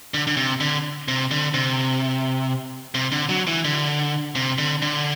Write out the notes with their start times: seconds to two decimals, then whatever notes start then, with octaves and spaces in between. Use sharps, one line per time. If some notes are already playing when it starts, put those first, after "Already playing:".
0.14 D3
0.27 D3
0.37 C3
0.60 D3
1.08 C3
1.31 D3
1.54 C3
2.95 C3
3.12 D3
3.29 F#3
3.47 E3
3.64 D3
4.35 C3
4.58 D3
4.82 D3